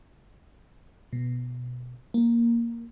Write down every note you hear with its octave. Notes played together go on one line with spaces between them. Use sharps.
B2
A#3